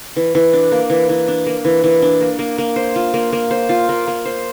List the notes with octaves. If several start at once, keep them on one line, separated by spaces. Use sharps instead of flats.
E3
E3
D4
A#3
E3
E3
D4
A#3
E3
E3
D4
A#3
A#3
A#3
C5
F4
A#3
A#3
C5
F4
A#3
A#3
C5